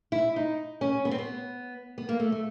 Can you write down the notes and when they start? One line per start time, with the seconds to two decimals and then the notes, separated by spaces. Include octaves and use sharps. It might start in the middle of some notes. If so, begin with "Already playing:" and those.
0.12 E4
0.36 D#4
0.81 C#4
1.05 B3
1.11 C4
1.18 B3
1.98 B3
2.09 A#3
2.20 A3
2.32 A3